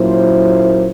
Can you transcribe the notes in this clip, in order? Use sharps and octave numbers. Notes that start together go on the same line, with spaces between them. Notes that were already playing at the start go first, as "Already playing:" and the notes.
Already playing: A#2 F#3 A#3 C#4 E4 C5